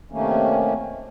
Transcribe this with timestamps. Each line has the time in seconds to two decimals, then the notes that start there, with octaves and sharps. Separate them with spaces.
0.12 C3 D#3 A3 A#3 C#4